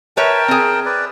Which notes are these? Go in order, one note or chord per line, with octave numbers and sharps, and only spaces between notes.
A#4 B4 C#5 E5 G5 A5
C4 G#4
B4 D5